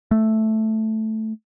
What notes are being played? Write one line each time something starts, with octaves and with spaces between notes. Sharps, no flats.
A3